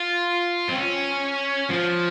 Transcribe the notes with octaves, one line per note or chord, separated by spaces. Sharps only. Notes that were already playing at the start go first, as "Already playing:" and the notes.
Already playing: F4
C4
C#4
F3